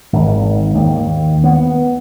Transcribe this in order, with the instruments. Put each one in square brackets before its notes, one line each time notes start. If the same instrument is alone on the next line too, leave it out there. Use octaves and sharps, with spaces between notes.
[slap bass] G#1
D#2
B3